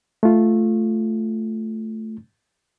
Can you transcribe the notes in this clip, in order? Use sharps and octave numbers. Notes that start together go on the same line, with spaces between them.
A3 F4